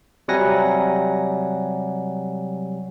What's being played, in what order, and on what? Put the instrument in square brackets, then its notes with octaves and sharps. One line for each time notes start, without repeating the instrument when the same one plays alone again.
[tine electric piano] C3 F#3 G3 F#5 G#5 A#6